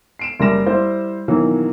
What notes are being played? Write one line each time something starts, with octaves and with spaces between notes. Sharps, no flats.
C7 D7 E7
F#1 G3 A#4 A#6 E7
G3 E4 C5
B2 D#3 E3 F#3 A#3